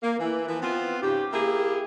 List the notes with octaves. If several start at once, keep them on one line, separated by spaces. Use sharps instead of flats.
A#3
E3
E3 F3
B3 C4 F4
G#2 C#3 G4
A#3 E4 G4 G#4